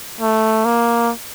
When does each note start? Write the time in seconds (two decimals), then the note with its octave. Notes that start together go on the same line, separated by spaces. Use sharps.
0.21 A3
0.65 A#3